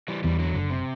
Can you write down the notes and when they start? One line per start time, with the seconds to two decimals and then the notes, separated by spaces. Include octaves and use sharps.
0.08 E3 G3
0.23 E2 E3 G3
0.39 D3 F#3
0.54 F#1 D3
0.70 C3